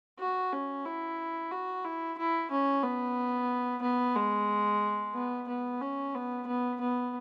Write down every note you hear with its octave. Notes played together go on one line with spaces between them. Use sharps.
F#4
C#4
E4
F#4
E4
E4
C#4
B3
B3
G#3
B3
B3
C#4
B3
B3
B3